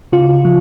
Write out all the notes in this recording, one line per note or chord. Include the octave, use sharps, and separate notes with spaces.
C#3 F4
F3